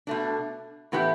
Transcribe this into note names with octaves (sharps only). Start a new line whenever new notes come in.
B2 A3 D4
A2 E3 B3 E4 G4